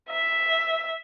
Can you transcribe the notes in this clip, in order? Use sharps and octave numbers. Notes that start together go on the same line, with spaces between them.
E5